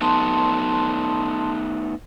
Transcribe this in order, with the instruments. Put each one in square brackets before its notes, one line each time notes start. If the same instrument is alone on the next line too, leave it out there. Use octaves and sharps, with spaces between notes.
[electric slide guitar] A3 B3 D#4 [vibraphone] A5 C6